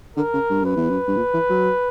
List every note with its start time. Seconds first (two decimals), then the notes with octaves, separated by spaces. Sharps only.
0.16 D3 A#4
0.34 C#3
0.50 G2
0.63 F#2 B4
0.77 E2
0.90 F#2
1.08 G2
1.17 A#2
1.34 E3
1.50 F#3